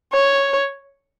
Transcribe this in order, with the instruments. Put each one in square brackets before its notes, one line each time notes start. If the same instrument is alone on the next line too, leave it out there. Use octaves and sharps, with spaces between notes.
[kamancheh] C#5